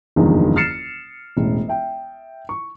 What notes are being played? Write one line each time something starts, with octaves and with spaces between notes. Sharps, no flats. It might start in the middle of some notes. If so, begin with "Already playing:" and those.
F#1 E2 G2 D#3 F3
F6 A6 C7 C#7 E7
E1 A1
E5 G5
C#6